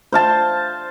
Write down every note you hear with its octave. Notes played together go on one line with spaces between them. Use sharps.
C5 F5 A5